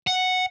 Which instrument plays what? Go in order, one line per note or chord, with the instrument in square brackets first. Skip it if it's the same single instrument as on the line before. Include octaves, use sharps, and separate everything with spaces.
[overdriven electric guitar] F#5